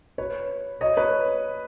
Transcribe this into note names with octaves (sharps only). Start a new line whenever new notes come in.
B4 C#5
C#5 D#5
B4 C#5